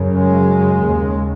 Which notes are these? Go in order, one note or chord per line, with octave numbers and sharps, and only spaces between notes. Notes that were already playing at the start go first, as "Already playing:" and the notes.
Already playing: F#2 C#3
G#3
D#2 C#3